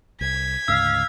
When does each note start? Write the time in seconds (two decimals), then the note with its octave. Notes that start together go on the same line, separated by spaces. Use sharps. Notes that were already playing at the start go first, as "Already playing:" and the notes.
0.21 C2 G#6 B6
0.68 D2 G#2 C#3 F5 E6